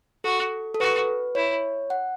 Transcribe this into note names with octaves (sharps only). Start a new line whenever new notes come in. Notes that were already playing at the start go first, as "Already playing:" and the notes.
F#4 A4
A4
F#4 B4
E4 C#5
F#5